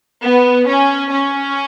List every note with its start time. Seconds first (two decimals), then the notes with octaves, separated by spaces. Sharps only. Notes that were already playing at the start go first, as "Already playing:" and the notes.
0.23 B3
0.68 C#4
1.12 C#4